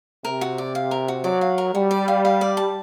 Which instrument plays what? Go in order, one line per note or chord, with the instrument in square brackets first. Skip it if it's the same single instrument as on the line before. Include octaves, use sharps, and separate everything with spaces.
[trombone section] C3 [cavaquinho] A#4
[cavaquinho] F#4
D5
F5
A#4
F#4
[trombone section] F#3 [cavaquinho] D5
[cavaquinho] F5
A#4
[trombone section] G3 [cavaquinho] F#4
[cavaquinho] D5
F5
F5
D5
A5